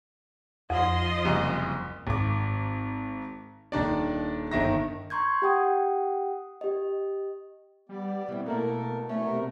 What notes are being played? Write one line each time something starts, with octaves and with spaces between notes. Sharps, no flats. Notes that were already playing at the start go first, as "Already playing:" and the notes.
F2 F3 D#5 C6
F#1 C2 C#3
G#1 D6
D#1 D#3 D4 D5
G1 D#3 E5 A#6
A#5 C6 C#6 G6 G#6
G4 F#5 G5 D#6
G4 D#5
G3 B3 D5
B2 G3 B3 C4 E4
A3 A#3 E4 A4 A#4
F#2 D3 E3 A3 C#4
F#2 C3 B3 A#4